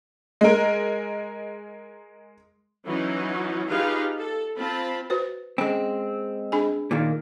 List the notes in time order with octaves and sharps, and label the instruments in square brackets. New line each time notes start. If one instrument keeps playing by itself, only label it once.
[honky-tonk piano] G#3 A#4
[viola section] E3 F#3 C#4 D#4
D#4 F4 G4 G#4 B4 F5
A4
C4 F4 A5 B5
[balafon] F#4 B4 C5
[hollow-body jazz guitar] G#3 C4 [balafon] C#4
[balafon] D4 G#4 G#5
[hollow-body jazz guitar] A#2 D#3 A#3